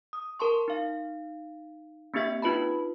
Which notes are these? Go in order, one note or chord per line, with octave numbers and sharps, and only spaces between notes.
D#6
A#4 A5 C6 C#6
D#4 F5
A#3 C4 D4 G4 E5 B6
D4 D#4 F4 B4 A5 B5